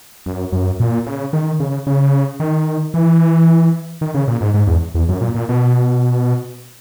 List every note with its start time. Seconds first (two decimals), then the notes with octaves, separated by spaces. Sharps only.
0.26 F#2
0.52 F#2
0.80 A#2
1.07 C#3
1.33 D#3
1.60 C#3
1.87 C#3
2.40 D#3
2.94 E3
4.01 D#3
4.14 C#3
4.28 A#2
4.41 G#2
4.54 G#2
4.67 E2
4.94 E2
5.09 F#2
5.21 A#2
5.35 A#2
5.49 B2